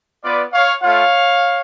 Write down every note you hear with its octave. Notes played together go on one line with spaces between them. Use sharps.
B3 F4 B4 D5
C#5 F5
A3 F4 C#5 F5